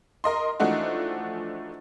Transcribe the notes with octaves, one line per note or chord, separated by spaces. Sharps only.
A#4 D#5 C6
E3 F3 A3 D4 D#4 F#4